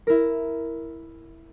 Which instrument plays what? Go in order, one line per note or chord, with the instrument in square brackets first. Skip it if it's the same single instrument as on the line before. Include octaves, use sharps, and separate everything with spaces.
[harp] E4 A#4